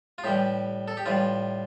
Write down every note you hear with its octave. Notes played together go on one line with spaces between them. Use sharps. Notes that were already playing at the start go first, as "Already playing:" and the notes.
F4
A2 E3 G3 G4
A4
G4
A2 E3 G3 F4